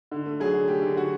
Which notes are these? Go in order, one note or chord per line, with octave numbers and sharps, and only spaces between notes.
D3
A3
F#3 G#4
D3
A3 G4
D3
D3 F#4